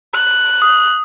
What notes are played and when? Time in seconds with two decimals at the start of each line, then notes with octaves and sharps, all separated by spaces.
0.14 F#6
0.62 D#6